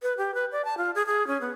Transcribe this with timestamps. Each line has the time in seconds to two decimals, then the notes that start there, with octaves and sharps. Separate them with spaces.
0.02 B4
0.17 G4
0.34 B4
0.52 D5
0.65 A5
0.77 F4
0.95 G#4
1.06 G#4
1.27 C#4
1.41 B3